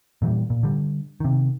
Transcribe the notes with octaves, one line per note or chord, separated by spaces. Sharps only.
A#2 E3 F#3 G3
A#2
D3 G3
C3 D#3